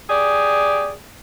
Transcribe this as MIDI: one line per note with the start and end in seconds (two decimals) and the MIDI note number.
0.10 0.92 67
0.10 0.92 68
0.10 0.92 74